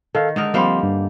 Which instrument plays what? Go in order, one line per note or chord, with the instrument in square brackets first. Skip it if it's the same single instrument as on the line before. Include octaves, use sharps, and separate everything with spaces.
[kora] D#3 [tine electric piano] A4 F5
[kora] D3 D#4 A#4 [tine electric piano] G#3
[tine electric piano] F3 C4 C6 [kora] G3 A#3 C5
[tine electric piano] G2